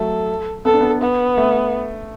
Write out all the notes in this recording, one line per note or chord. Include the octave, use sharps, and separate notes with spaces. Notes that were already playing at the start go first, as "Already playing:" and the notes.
Already playing: F#3 A3 A4
B3 A4
D4
B3
B3
A3